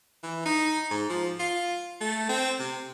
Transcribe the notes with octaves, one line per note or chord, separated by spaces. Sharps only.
E3
D#4
G#2
F3
F4
A3
C4
C3